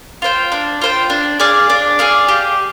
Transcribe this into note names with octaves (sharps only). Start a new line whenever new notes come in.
F4 C5 G5
D4
F4 C5 G5
D4
G#4 D5 F5
D4
G#4 D5 F5
G4